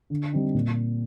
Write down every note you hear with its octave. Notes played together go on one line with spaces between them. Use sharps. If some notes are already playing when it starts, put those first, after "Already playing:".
D3
G3 C4 D#4
A#2